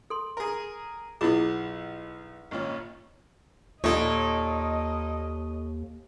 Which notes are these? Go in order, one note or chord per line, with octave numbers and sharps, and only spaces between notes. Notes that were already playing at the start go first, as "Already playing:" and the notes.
A4 C6
G#4 A#4
B1 B3 E4 F4 G#4
G#1 A#2 C#4
D#2 A#2 D#4 A4 C#5 D#5